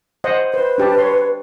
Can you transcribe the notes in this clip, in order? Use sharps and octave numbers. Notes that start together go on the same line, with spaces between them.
C5 D#5 F#5
B4 C5
D4 G4 A5
C#5 C6